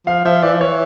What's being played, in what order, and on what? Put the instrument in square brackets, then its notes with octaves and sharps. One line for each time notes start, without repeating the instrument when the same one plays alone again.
[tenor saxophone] F3 [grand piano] F5
[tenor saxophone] F3 [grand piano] E5
[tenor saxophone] E3 [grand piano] D5
[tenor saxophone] F3
[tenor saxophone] E3 [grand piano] C#5